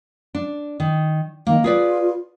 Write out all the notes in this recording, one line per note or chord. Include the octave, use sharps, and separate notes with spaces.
D4
D#3
D#3 A#3
F4 G#4 B4 D5